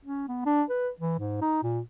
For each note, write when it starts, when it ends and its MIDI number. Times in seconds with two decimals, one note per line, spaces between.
0.06 0.28 61
0.28 0.45 59
0.46 0.63 62
0.70 0.89 71
1.01 1.15 52
1.19 1.38 44
1.42 1.61 63
1.63 1.80 46